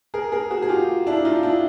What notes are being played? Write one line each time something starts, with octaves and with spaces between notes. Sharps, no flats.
G#4 A#4
G#4 A#4
F#4 G#4
G#4
F4 G4
D4 E4
D#4 F4
D4 E4